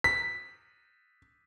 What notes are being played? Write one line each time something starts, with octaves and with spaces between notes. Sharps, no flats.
B6